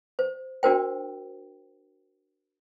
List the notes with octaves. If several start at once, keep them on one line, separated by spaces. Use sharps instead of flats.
C5
D4 F#4 A#4 C5 G5